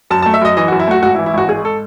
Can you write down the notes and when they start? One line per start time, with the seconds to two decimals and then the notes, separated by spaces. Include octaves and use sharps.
0.10 F#2 A5
0.22 A5
0.26 A3
0.34 E5
0.41 F#2 D#5
0.57 E3 D#5
0.68 F#4
0.72 F#2
0.80 E4
0.88 A3 F#4
1.03 G#1 F#4
1.15 E4
1.18 E3
1.26 E4
1.34 G#1 F#4
1.48 G#2 G#4
1.65 A4